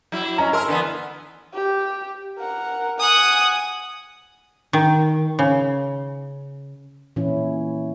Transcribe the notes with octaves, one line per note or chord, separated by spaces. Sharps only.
F#3 E4
C#4 D#5 A#5
A#4 A5 C6 E6
D3 E3 B3
G4
A#4 F#5
F#5 G#5 D#6
D#3
C#3
A#2 E3 C#4 E4